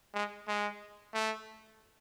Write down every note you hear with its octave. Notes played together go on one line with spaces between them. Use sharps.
G#3
G#3
A3